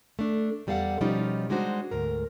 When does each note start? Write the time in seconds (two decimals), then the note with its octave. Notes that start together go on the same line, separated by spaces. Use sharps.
0.19 A3 D4
0.67 E2 G3 A4 F5 F#5
1.01 B2 F3 G3 C#4 D#4 F4
1.49 G3 G#3 D4 D#4 F#4 C5
1.91 D2 G#2 A#4